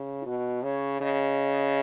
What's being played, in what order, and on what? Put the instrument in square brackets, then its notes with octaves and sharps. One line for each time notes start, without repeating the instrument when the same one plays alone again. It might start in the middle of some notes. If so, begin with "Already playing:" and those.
Already playing: [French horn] C#3
[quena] E4
[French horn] B2 [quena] F#4
[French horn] C#3 [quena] C#5
[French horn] C#3 [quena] D#5